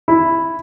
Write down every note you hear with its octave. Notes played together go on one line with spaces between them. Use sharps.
E4